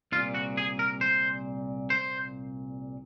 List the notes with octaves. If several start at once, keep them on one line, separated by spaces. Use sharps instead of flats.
C2 A#2 F4
F#4
G#4
A#4
C5
C5